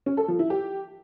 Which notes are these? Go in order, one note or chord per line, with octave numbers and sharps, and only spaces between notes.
C#4
A4
F3
E4
G4